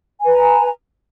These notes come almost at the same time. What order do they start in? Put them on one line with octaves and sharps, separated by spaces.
G#5 B4 A#5